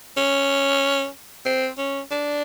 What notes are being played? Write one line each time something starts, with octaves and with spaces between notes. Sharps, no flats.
C#4
C4
C#4
D4